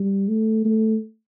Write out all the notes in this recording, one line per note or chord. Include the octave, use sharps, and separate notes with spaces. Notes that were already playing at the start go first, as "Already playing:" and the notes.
Already playing: G3
A3
A3